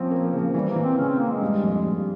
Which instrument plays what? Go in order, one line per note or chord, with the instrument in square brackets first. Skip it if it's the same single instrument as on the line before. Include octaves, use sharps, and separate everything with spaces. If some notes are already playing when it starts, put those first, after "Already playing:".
Already playing: [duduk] F3 [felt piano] C4 C#4
[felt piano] A#3
C#3
[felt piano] E3 [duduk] G3
[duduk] A#3
[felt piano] E3
[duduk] C4
[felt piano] C#3 [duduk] C#4
[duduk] C4
A#3
G#3
[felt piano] G2
F2
G2